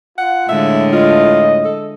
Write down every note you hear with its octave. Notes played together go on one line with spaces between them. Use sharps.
F4 F#5
A2 D3 G#3 E5
F4 D#5
A4